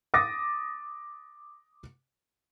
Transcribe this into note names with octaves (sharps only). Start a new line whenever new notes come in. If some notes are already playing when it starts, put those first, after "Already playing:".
D6 D#6 A6 A#6